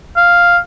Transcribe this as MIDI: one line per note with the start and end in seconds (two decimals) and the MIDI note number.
0.16 0.58 77